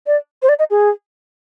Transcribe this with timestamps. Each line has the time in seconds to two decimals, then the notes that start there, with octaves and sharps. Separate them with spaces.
0.07 D5
0.42 C5
0.49 D5
0.59 D#5
0.70 G#4